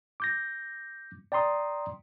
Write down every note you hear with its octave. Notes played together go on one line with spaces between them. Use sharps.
D6 G6 A#6
D5 G5 A#5 C6 D#6